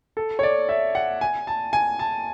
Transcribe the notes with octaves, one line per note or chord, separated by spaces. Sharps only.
A4
C#5
D5
E5
F#5
G#5
A5
G#5
A5